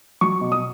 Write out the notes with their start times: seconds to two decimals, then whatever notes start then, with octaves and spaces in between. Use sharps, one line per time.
0.21 F#3 C#6
0.41 B2
0.52 D#6